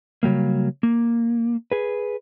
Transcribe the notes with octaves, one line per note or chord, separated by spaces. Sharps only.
C#3 F#3 G3 A#3
A#3
G#4 B4